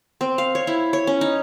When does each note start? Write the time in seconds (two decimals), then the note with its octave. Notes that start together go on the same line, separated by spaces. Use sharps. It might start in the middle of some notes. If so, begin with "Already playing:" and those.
0.21 C4
0.38 F5
0.55 C#5
0.67 E4
0.93 C#5
1.07 C#4
1.21 D#4